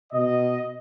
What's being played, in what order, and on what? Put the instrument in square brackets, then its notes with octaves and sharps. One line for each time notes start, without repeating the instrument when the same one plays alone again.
[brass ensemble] B2 D#5